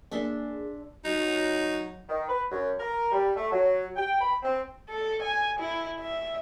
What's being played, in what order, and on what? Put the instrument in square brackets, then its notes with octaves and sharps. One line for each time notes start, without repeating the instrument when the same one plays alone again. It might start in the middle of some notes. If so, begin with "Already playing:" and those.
[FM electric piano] A#3 G#4 [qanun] D4 E5 C6
[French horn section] F#3 F#4 [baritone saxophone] D#4
[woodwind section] D#3
B4
F#2
A#4
G3
A3
F#3
G5
B5
C4
[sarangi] A4
G#5
E4
E5